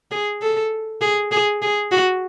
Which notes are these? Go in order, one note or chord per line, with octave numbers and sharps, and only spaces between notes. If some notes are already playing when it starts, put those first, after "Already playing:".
G#4
A4
G#4
G#4
G#4
F#4